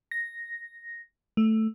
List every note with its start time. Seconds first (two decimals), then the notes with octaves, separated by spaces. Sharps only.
0.11 A#6
1.37 A3